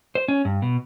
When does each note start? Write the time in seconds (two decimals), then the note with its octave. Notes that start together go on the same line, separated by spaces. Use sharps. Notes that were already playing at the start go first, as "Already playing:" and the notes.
0.15 C5
0.28 C#4
0.45 G2
0.62 B2